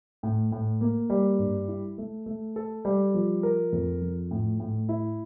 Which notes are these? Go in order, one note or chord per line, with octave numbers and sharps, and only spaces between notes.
A2
A2
A#3
G3
G2
E4
A3
A3
A4
G3
F3
A#4
F2
F3
A2
A2
E4